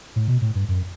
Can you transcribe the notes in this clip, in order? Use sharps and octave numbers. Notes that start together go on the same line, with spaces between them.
A2
B2
A2
G2
F#2